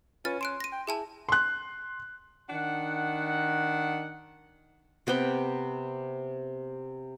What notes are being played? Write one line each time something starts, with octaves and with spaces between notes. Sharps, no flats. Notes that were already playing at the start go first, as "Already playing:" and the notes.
C#4 F4 B4 C#5 F6 A6
C6 F#6 D7 E7
A#6 D#7
G5
E4 G#4 G#5 A5
C6 F#6
D#3 D4 F#5
C3 B3 G4 G5